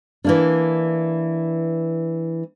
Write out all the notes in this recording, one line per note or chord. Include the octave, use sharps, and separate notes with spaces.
E3 A#3 D4